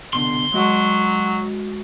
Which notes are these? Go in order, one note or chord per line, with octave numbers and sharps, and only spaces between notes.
C2 B2 D3 C6
F#3 G#3 F#4 F#5